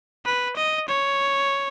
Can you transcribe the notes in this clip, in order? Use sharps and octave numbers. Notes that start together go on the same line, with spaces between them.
B4
D#5
C#5